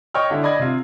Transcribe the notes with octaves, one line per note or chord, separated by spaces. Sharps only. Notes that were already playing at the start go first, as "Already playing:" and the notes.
C#5 D#5 G5 F6
D3 E4
D5 D#5 B5 G#6
C3 F4